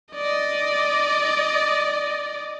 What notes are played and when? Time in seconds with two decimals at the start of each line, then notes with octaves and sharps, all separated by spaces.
0.14 D5 D#5